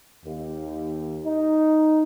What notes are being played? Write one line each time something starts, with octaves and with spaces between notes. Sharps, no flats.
D#2
D#4